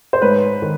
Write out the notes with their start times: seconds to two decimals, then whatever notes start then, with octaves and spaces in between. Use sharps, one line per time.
0.13 C5
0.21 G#2 B4 C#5
0.62 D#3